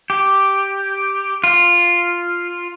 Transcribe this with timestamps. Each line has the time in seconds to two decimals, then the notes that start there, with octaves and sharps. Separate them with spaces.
0.10 G4
1.44 F4